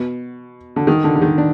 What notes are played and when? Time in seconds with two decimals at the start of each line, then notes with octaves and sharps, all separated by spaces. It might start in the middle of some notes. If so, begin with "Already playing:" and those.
Already playing: B2
0.76 D3
0.87 D#3
1.04 D3
1.15 D3
1.22 D#3
1.38 D4